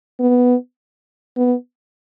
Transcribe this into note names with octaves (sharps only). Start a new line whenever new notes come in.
B3
B3